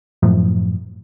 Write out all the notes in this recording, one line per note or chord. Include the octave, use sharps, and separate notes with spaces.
F#2 A2 F3